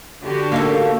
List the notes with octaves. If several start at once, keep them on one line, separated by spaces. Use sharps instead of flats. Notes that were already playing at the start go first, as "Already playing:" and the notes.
D3 F#4 G4
A#3 D#4 A4